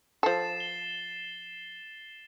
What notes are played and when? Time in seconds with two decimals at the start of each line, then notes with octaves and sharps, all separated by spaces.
0.23 F3 A4 A6 C7 E7
0.60 G7